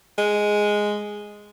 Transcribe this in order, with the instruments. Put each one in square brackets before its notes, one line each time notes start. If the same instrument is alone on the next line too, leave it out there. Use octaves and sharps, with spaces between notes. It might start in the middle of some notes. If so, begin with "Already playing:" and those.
[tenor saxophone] G#3